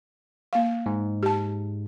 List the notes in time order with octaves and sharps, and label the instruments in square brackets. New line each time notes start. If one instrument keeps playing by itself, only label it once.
[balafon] A#3 F5
[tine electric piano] G#2
[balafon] G4 A5